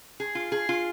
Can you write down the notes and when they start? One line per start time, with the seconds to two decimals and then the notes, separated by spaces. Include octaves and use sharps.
0.20 G#4
0.35 F4
0.52 G#4
0.69 F4